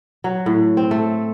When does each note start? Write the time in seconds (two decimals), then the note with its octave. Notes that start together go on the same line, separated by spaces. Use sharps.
0.24 F#3
0.46 A2
0.77 C4
0.91 A3